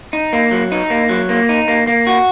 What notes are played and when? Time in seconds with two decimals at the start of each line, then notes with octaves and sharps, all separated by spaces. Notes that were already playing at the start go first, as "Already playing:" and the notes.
0.13 D#4
0.33 A#3
0.51 F#3
0.72 D#4
0.90 A#3
1.09 F#3
1.29 A#3
1.49 D#4
1.68 A#3
1.87 A#3
2.07 F#4